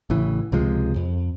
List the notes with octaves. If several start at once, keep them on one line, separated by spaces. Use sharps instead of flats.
A1 C#3 E3
C#2 C3 F3 G#3
F2